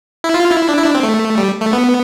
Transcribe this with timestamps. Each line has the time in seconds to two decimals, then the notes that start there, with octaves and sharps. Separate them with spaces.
0.24 E4
0.34 F4
0.52 E4
0.69 D4
0.78 E4
0.86 D4
0.95 C4
1.03 A3
1.38 G3
1.61 A3
1.73 B3